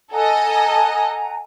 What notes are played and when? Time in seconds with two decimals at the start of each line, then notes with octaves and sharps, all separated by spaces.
0.13 A4 D#5 F#5 G#5 A#5